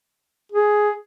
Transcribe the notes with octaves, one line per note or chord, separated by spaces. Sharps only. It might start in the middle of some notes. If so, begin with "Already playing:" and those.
G#4